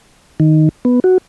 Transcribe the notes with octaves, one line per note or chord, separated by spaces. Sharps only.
D#3
B3
F#4